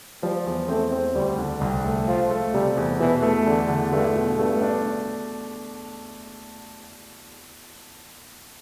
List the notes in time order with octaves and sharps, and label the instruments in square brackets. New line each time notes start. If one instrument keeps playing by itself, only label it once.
[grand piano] F3 [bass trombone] G3
[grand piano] E2
[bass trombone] A3 [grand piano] C4
[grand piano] C4
[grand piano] D2 [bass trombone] G3
[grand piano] D3
C2
A3
[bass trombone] F3 [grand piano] F4
[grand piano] A3
[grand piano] C3 [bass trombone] G3
[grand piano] E2
[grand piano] B2 [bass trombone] E3
[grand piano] A3
[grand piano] E2 [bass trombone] D3
[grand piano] D3
[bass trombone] G2 [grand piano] A3
[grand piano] B2
[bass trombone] G2 [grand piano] A3
[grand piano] D4